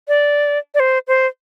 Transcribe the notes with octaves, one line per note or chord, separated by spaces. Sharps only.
D5
D5
C5
C5